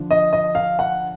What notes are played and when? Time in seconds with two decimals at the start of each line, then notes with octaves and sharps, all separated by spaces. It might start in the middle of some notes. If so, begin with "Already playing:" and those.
Already playing: D3 F3 D4
0.11 D#5
0.33 D#5
0.55 F5
0.79 F#5